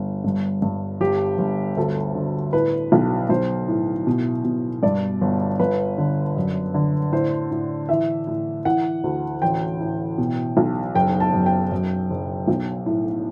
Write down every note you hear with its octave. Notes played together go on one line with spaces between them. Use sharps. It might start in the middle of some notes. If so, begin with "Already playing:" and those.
Already playing: G1
G2
G2
G1 G4
G1
D2 A4
D3
A2 B4
B1
B1 C5
A2
B2
B2
G2 D5
G1
G1 B4
D3
F#2
D3
A2 C5
A2
E3 E5
A2
E3 F#5
D2
A1 G5
A2
B2
B1
F#1 G5
A5
F#2
G5
F#2
F#1
B1
A2